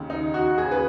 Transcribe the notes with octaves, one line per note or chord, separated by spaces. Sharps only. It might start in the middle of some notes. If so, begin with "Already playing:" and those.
Already playing: D#2 C#3
D#4
F#4
D#2 C#3 G#4
B4